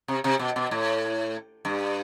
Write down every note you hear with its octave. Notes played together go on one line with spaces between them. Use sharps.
C3
C3
B2
B2
A2
G2